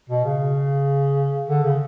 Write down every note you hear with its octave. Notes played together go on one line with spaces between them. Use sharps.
B2
C#3
D3
C#3